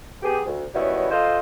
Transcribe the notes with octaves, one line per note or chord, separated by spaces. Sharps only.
B3 G4 G#4
D2
D#3 F#3 G3 B3 C#4 E4
F4 A4 C5 D#5 F5